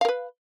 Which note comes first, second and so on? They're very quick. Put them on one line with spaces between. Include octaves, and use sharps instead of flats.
F5 A#4 B4